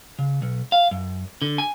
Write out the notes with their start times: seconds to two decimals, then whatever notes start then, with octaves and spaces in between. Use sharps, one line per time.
0.19 C#3
0.42 B1
0.72 F5
0.91 F#2
1.42 D3
1.58 G#5